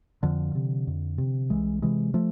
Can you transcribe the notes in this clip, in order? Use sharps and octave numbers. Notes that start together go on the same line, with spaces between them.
F2 D3 F3
C3
F2
C3
C2 E3 G#3
C3 E3 G#3
F3 A3